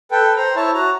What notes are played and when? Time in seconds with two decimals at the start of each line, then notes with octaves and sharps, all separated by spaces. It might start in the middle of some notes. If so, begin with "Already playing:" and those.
0.11 A4 B4 G5
0.37 C5 A#5
0.56 E4 C#5 A5
0.74 F#4 A#5